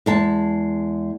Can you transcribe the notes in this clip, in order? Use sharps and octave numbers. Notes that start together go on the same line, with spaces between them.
E2 G#3 A5